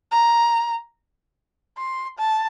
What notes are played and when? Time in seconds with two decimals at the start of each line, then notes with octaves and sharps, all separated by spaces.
0.12 A#5
1.78 C6
2.19 A5